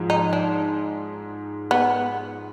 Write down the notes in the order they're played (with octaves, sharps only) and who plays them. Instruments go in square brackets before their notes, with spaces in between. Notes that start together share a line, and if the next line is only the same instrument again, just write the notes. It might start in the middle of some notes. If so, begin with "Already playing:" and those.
Already playing: [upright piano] G#2 F3 G#3
[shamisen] D#4
D4
B3